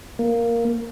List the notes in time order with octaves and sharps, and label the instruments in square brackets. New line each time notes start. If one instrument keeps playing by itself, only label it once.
[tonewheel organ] A#3